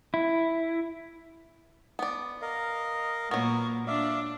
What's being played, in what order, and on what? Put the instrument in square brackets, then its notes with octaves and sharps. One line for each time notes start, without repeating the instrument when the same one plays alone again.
[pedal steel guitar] E4
[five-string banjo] B3 D5
[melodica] A#4 D#5 F5
[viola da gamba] A#2 A#3 [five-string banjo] F#3 B3 [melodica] A#4 C#6
[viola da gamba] D4 [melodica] D5 E5 F5